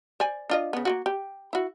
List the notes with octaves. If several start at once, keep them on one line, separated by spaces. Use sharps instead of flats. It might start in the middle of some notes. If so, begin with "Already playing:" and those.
C5 D5 G#5
D4 F4 D#5
C#3 B3
A#3 F4 F#4
G4
E4 F#4